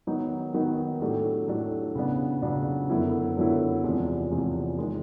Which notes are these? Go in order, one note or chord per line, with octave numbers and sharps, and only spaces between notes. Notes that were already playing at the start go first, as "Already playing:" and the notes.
D#3 F#3 B3 D#4 F#4
D#3 F#3 B3 D#4 F#4
A2 F#3 A3 D4 G4
A2 F#3 A3 D4 G4
C#3 F#3 B3 D4
C#3 F#3 B3 D4
F#2 D3 F#3 B3 E4
F#2 D3 F#3 B3 E4
E2 C3 F3 G#3
E2 C3 F3 G#3
D#3 G#3